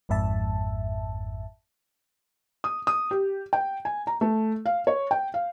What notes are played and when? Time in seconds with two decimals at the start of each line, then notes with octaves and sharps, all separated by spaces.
0.09 G#1 F2 G#2 E5 A5
2.64 D#6
2.87 D#6
3.11 G4
3.53 G5
3.85 G#5
4.07 A#5
4.21 A3
4.66 F5
4.87 C#5
5.11 G5
5.34 F5